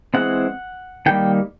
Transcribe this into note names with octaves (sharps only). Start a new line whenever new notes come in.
E3 G#3 C4 F#5
D#3 G3 A#3 G5